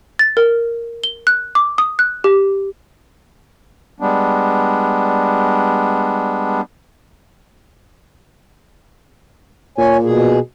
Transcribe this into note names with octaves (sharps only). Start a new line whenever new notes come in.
A6
A#4
G7
F#6
D6
D#6
F#6
G4
G3 G#3 B3 D4
A#2 C#5 G#5
B2 G#4